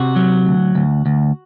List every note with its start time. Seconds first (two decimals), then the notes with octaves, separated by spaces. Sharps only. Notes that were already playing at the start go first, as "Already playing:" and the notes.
Already playing: C3 F#4
0.16 F#3
0.46 D2
0.75 D2
1.06 D2